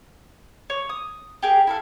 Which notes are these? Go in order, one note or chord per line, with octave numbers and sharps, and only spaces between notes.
C#5
D#6
G4 G#4 A#4
E4 A4 F5